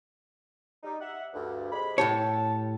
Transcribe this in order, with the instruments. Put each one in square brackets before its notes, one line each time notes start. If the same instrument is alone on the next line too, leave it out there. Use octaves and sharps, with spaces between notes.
[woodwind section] G3 D#4
E5 F#5
D2 G2
C3 G#3 B5
[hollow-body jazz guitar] A2 G4 C#5 [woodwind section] A5